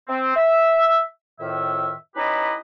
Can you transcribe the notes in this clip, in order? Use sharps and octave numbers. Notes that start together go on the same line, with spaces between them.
C4
E5
F2 A2 D#3 E5
C#4 D#4 E4 G4 B4 D#5